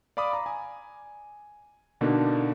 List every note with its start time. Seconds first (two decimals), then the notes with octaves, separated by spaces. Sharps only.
0.17 D5 F5 B5 D6 D#6
0.33 A#5
0.46 G#5
2.01 B2 D3 A#3 D4 D#4